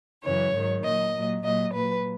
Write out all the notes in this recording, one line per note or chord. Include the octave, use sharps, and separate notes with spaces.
F#2 C#3 E3 C#5
G#2 D#3 F#3
A#2 F#3 D#5
A#2 F#3
A#2 F#3 D#5
A#2 F#3 B4